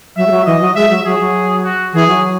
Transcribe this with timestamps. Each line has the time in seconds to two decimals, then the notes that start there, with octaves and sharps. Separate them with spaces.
0.16 F#3 E5
0.27 G#3
0.31 F#3
0.46 E3 D#5
0.61 F#3
0.75 G#3 E5
0.90 F#3
1.05 F#3 G#4
1.20 F#3
1.64 F#4
1.93 E3 G#4
2.08 F#3